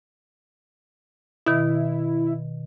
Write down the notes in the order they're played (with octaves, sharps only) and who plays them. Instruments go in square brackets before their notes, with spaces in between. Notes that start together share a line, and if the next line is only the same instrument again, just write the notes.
[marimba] B2 D#3 [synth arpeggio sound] E4